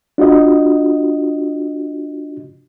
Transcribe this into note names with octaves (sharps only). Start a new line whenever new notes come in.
D4 F4 F#4 D#5